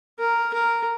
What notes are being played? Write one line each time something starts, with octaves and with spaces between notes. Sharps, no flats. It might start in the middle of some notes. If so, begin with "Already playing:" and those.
A#4
A#4